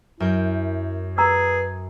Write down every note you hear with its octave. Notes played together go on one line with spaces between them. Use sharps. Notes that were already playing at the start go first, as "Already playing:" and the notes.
F#2 E4 A#4 G6
G#4 B4 A#5 E6